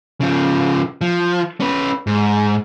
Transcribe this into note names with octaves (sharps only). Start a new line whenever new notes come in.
C#3 F3
F3
C#4 B4
G#2